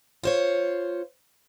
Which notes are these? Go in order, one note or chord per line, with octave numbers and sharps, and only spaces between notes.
F4 C5 C#5